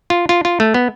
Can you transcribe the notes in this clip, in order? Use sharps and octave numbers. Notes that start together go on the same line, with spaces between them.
F4
F4
F4
A3
B3